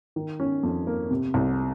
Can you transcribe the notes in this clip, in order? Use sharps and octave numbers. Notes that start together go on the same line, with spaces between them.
D#3
C#4
F2
A#3
C3
C2